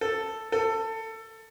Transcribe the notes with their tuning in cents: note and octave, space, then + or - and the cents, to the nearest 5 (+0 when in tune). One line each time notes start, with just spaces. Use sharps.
A4 +5
A4 +20